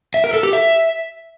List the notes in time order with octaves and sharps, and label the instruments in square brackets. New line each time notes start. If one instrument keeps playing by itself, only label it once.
[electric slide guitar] E5
A#4
A4
G4
E5